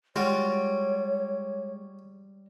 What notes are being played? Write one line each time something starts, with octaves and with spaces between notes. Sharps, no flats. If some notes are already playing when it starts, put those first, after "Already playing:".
G3 G#3 F4 F#4 C#5